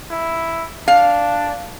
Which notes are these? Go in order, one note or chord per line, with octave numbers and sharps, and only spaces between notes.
E4
D4 F5